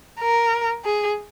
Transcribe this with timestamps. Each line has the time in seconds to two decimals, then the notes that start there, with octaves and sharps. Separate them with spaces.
0.20 A#4
0.84 G#4